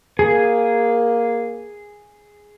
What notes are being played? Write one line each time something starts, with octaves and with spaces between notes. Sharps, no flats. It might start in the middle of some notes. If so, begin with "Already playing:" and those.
A#3 G#4